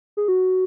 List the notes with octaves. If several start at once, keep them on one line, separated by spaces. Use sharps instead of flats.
G#4
F#4